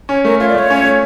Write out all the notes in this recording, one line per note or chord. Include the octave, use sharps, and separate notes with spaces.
C#4 C#5
A3 A#4
F4 C#5
D5
A3 C#5
C#4
A3